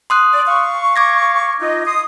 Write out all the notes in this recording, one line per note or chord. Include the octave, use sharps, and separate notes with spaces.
C6 D#6 F#6
D5
F5 C#6
D6 G#6 A#6
D#4 F4 D#5
C6 D#6